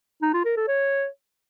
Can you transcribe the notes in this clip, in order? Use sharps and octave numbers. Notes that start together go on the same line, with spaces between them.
D#4
F4
A#4
A4
C#5